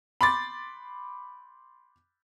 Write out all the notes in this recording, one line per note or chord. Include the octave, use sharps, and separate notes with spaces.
B5 C6 D6 A6